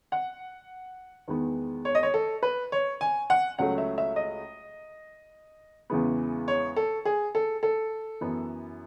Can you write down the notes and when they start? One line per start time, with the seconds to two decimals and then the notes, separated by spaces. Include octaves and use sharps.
0.12 F#5
1.28 E2 D#3 G#3 B3
1.85 C#5
1.95 D#5
2.03 C#5
2.14 A4
2.43 B4
2.72 C#5
3.01 G#5
3.30 F#5
3.59 C#2 C#3 F#3 A3 F#5
3.78 E5
3.98 E5
4.16 D#5
5.90 E2 C#3 E3 G#3 B3
6.48 C#5
6.76 A4
7.05 G#4
7.35 A4
7.63 A4
8.21 F#2 E3 B3